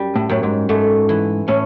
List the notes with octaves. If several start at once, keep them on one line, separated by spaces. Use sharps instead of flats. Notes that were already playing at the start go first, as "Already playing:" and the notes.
Already playing: F#2 G3
A2
F#2 A2
G#2
G#2 A3
E3
A2 C#4